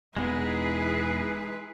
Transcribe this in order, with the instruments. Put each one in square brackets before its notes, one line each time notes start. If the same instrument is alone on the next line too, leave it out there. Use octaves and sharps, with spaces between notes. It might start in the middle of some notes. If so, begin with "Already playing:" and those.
[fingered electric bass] E1 E2 B3 [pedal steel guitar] G#3 D#4 [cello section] E4 G#4 [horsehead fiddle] B4